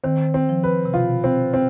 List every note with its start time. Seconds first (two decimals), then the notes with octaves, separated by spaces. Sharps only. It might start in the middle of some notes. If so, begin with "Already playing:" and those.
0.04 D#3 C4
0.34 C4
0.49 F3
0.64 B4
0.85 C3
0.94 B2 F4
1.24 C4
1.54 C4